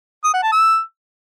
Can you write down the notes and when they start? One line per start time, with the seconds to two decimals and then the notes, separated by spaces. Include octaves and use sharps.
0.24 D#6
0.33 F#5
0.43 A5
0.52 E6